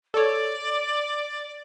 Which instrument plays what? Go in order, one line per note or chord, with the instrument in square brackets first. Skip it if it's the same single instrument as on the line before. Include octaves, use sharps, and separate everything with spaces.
[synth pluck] A4 C#5 [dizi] D5